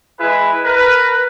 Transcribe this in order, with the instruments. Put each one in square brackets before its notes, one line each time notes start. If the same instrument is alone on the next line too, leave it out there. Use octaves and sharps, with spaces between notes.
[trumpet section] G#3 E4 G#4 B4
A#4 B4